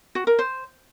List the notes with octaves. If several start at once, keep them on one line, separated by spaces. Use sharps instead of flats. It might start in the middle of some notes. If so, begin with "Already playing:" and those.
F#4
A#4
C5